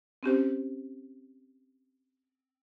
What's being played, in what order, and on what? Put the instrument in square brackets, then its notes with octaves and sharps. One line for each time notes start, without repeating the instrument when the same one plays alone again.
[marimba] C4 C#4 G4 C5